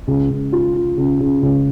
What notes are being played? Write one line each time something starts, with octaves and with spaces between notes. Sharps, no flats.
C#2
C#2
F4
F4
C#3
C#3
C#2